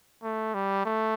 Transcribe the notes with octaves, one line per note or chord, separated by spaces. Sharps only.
A3
G3
A3